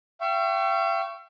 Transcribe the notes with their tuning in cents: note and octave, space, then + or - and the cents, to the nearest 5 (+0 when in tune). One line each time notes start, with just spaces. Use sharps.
E5 +45 G5 -25 C#6 +0